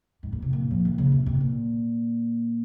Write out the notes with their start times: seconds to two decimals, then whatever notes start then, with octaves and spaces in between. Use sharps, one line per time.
0.23 G#2
0.32 A#2
0.42 C3
0.53 A#2
0.71 F3
0.85 D#3
0.98 C#3
1.12 C3
1.26 C3
1.41 A#2